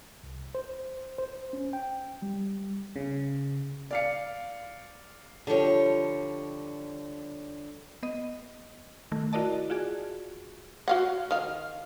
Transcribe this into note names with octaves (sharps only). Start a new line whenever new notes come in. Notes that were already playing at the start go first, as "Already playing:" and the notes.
C2
C5
C5
C#4
G5
G3
C#3
D5 F5 C#7
D3 F3 G3 C#5
B3 D#5
D#3 A3
E4 F#4 A#4 D5 D#5 A5
F4 F#4 G#4 D5
F#4 F5 F#5
D#3 F5